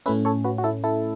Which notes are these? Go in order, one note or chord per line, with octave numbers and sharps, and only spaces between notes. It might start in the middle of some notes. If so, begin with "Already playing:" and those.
A2 A3 C#4 B4 E5
A4 C#5
F#4 B4
F#4
E4 A4
E4 A4